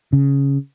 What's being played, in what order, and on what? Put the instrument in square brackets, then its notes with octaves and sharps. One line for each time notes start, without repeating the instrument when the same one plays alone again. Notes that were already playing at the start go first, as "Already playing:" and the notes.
[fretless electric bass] C#3